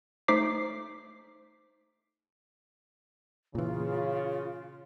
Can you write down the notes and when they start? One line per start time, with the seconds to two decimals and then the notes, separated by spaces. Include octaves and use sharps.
0.28 A3 D#4 C5 D6 B6 C7
3.55 A#2 C#3 E3 F4